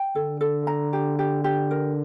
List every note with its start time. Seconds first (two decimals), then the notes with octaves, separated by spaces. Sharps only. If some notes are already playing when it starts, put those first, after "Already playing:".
Already playing: G5
0.15 D3 A4
0.41 A4
0.67 A#5
0.93 G4
1.19 G4
1.44 G4
1.71 A#4